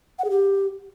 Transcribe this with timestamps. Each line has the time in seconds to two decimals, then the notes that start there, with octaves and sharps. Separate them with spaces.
0.19 F#5
0.24 G#4
0.30 G4